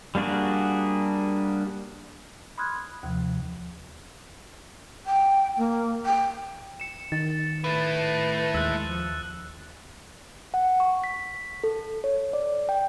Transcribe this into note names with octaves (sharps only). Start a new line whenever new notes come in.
G3 A#3 D4 F#4 G#4
B5 C6 D#6 F6 F#6 G#6
D#2 C3 F3
G5
A#3
G5
C#7 E7
D#3 A6
A3 E4 B4 D#7
D#2 G#3 E6 F#6
F3
F#5
C#6
B6
A4
C#5
D5
G5